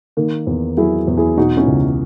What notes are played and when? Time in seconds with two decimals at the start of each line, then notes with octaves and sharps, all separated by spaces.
0.17 D#3 A#3
0.47 E2
0.77 F#3 E4 G#4
1.07 E2
1.17 E4 G#4
1.37 B2 D#4 F#4
1.57 C#4 E4
1.67 C#2